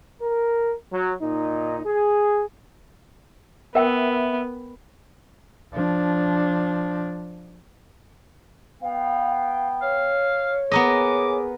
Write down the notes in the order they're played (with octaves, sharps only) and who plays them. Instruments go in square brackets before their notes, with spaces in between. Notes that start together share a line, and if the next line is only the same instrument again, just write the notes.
[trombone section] A#4
F#3
A#2 D#4
G#4
[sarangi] B3 [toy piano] A#4 G5 [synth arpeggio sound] E5
[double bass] F3 D4
[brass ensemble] B3 G5 [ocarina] F5
[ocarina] C#5 [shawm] F5
[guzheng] B3 A#4 D#5 [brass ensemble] G#4 [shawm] D6